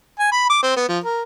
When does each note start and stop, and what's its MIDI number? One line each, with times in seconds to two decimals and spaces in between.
0.19 0.31 80
0.32 0.49 83
0.49 0.60 86
0.63 0.73 60
0.76 0.85 59
0.89 0.98 53
1.04 1.22 70